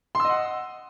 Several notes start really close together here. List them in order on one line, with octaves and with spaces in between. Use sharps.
C6 E6 D#5 F#5